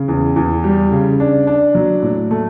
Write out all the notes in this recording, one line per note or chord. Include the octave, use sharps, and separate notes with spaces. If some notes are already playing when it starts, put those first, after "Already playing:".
Already playing: C#3
E2
E2
G3
C#3
D4
D4
F#3
A2
A3